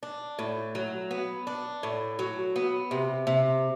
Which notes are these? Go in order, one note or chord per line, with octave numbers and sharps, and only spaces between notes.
D4
A2
F#3
B3
D4
A2
F#3
B3
C3
C3